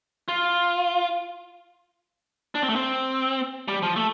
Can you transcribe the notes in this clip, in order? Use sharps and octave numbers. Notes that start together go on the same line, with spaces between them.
F4
D4
C4
A3
C4
G3
F3
A3